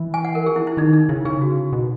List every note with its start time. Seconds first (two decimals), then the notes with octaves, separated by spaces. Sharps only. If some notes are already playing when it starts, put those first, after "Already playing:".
Already playing: E3
0.14 G#5
0.25 F#5
0.35 A#4
0.46 G#4
0.56 E4
0.67 E4
0.77 D#3 D#4
0.93 D#4
1.09 C#3 E4
1.25 C#3 G#4
1.41 F#4
1.72 B2